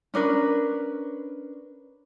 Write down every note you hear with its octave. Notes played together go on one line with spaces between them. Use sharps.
C#4 D4 A#4 B4